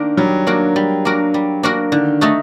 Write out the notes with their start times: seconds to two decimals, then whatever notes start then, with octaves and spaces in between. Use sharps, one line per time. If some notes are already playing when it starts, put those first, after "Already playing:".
Already playing: D#3 A#3 D4 A#4
0.17 F#3 G3
0.47 A#3 D4 F#4 A#4
0.76 G3
1.05 A#3 D4 F#4 A#4
1.34 G3
1.63 A#3 D4 F#4 A#4
1.92 D3 D#3
2.21 A3 D#4 F#4 A4